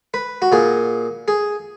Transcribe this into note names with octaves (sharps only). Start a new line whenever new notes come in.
B4
F#4
A#2 G#4
G#4